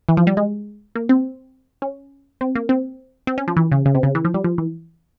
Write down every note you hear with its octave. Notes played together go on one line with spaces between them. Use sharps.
E3
F3
G3
G#3
A#3
C4
C#4
C4
A#3
C4
C4
C#4
F3
E3
C#3
C#3
C3
C#3
E3
F3
G3
F3
E3